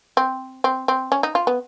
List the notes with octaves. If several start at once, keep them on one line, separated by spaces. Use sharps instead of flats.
C4
C4
C4
C#4
D#4
F4
B3